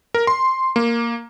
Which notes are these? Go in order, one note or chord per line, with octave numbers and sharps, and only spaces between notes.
A#4
C6
A#3